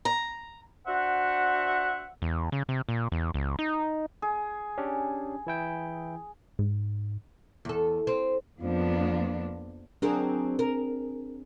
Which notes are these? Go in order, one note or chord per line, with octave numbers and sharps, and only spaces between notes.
A#5
D4 F#4 C5 E5 F#5
E2
C#3
C3
A#2
E2
C#2
D#4
G#4
C#4 D4 G4
E3 E4 G5
G#2
E2 A4
C4
F2 F3 A#3 B3 D4
F#3 C4 D4 G#4 A#4
A#4